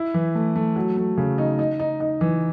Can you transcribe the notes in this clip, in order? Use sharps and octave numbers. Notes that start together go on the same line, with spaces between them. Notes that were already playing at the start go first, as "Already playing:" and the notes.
Already playing: E4
E3
A3
A3
F#3
A3
C#3
D#4
D#4
D#4
D#4
E3